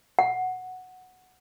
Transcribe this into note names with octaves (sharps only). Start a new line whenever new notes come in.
F#5